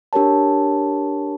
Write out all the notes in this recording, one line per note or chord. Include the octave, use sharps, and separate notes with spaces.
D4 G4 A#4 C#5 A5